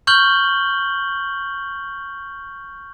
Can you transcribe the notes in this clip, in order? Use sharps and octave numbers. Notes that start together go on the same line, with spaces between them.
C#6 F6 G6 F#7 G7